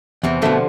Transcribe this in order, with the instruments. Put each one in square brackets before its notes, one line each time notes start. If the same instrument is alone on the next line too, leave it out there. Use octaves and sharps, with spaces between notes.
[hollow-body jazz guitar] E2 [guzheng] C3 E3
[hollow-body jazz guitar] B2 A3 [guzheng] D3 F3